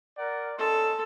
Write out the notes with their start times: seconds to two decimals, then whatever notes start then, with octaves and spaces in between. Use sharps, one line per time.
0.18 A#4 D5 F#5
0.58 C#4 A4 D#5 C6